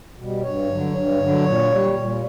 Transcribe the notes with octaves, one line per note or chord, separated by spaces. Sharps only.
B2 G3
G2 C#5
D3 F#3
G2
D3 F#3
A#2
G3
A#2